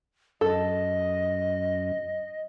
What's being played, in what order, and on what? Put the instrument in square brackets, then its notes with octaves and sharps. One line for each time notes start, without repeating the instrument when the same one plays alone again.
[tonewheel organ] F#2 [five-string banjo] A4 [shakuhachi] D#5